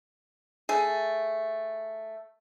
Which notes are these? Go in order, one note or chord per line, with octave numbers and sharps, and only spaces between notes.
A3 G#4